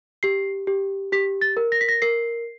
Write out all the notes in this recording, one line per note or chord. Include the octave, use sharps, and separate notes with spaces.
G4 C7
G4
G4 B6
A6
A#4
A#6
B6
A#6
A#4 C7